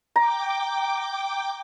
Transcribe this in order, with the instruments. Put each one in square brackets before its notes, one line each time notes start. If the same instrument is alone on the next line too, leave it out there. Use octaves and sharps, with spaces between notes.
[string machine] G5 D6 [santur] A#5